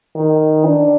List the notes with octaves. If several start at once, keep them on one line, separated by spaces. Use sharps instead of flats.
D#3
D4